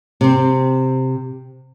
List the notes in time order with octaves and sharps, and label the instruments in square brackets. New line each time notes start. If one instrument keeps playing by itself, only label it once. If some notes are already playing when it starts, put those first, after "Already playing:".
[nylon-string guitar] C3 C4